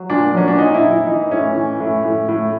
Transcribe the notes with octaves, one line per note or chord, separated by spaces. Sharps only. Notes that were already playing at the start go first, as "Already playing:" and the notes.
Already playing: F#3
A#2 D4
F#3 C#4
D4
A#2 D#4
E4
A#2
E4
E3 D#4
A2 C#4
E3
A2
A2
A2